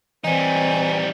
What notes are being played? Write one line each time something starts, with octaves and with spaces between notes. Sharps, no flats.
E3 G3 C4 D#4 G#5